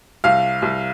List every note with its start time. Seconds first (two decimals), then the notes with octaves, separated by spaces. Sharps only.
0.24 C2 F5
0.62 C2